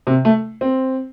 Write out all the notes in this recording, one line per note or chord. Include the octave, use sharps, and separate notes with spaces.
C3
A3
C4